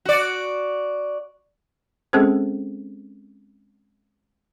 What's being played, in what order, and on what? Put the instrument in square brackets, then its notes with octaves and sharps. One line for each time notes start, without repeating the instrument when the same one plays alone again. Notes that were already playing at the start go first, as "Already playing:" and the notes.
[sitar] F#4 D5
[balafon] G#3 C4 C#4 G#4 A4 C5